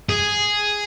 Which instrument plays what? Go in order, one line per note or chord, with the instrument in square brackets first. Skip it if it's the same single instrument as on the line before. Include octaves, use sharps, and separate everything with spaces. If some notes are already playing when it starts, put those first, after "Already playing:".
[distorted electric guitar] G#4